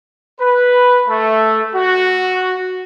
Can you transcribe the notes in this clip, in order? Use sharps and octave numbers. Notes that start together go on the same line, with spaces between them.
B4
A3
F#4